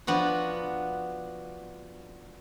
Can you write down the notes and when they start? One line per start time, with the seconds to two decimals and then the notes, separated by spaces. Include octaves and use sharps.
0.07 F3 B3 D4 F#4